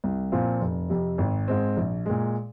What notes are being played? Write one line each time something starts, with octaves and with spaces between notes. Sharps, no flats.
C2
A#2 F3 C4 F4
F1
F2 C3
G#1
G#2 G#3 C4
A#1
A#2 G#3